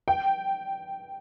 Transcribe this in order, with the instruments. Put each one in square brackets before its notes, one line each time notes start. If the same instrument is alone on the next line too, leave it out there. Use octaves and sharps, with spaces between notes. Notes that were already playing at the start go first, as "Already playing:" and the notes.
[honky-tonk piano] G5